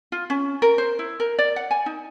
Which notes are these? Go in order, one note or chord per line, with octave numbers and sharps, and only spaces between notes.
F4
C#4
A#4
C5
E4
A#4
D5
F#5
G#5
D#4